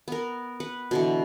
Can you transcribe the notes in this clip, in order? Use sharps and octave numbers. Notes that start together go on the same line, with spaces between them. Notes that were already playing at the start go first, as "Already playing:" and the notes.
B3 A#4
B4 F#5
B2 D3 E3